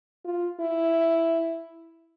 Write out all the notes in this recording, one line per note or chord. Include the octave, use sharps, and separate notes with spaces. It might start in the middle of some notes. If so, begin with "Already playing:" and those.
F4
E4